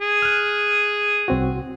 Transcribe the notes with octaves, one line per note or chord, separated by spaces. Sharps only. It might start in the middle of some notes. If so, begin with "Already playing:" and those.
G#4
F6 F#6
C2 C4 F#4